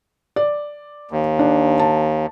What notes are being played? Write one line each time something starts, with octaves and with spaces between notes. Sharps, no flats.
D5
D#2
D4
A5